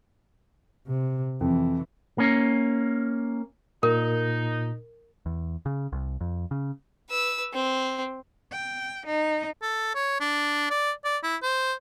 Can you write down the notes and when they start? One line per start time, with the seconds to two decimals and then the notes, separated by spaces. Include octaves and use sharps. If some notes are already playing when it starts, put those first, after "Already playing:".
0.87 C3
1.41 F2 E3
2.18 A#3 C#4
3.83 A#2 D#4 A#4
5.26 E2
5.66 C#3
5.92 C2
6.21 F2
6.51 C#3
7.10 B4 E6
7.54 C4
8.52 G5
9.06 D#4
9.62 A4
9.95 C#5
10.20 D4
10.70 D5
11.05 D5
11.23 E4
11.43 C5